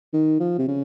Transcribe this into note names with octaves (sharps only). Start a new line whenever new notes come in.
D#3
F3
C3
C#3